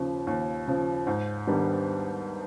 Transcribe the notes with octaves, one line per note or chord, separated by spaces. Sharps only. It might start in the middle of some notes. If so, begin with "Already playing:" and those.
Already playing: D#2 C#3 F3
D#2
C#3 F3
G#2
D#3 G3 B3 D4